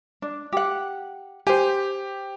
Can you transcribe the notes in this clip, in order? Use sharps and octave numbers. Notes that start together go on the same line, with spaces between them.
D4
G4 F#5
G4 C5 G#5